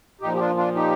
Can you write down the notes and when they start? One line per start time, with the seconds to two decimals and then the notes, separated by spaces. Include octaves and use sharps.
0.21 A#2 F3 D#4 G4
0.34 G4
0.39 D4 F4
0.57 D4 F4
0.75 D#4 G4